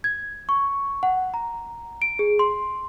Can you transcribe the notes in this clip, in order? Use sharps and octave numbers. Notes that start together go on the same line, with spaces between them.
G#6
C#6
F#5
A#5
D7
G#4
C6